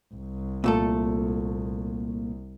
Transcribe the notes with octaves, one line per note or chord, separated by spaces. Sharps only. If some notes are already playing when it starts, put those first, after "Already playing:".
C2
A#2 A3 A4